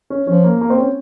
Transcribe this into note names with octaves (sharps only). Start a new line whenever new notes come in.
C#4
F3 C#4
A#3
A#3
C4
C#4